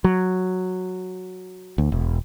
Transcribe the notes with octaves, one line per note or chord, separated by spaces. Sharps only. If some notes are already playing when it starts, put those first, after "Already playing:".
F#3
D2
E1